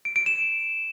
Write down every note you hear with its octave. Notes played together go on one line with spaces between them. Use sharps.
D7
D7
E7